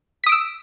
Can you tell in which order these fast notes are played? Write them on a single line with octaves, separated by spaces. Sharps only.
B6 D#6 D7 E6